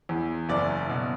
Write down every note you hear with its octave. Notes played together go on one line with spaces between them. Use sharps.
E2
F#1 D5
B2